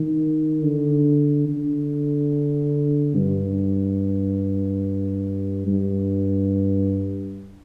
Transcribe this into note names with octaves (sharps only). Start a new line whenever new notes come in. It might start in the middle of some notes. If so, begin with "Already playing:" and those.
Already playing: D#3
D3
D3
G2
G2